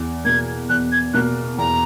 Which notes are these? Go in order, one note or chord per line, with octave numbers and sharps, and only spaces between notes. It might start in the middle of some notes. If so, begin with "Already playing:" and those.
Already playing: E2
B2 A#3 G#6
E2 F#6
G#6
B2 A#3 F#6
E2 A#5